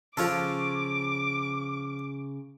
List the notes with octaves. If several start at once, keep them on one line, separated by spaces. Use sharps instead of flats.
C#3 F3 F4 A4 C#5 D6 F#6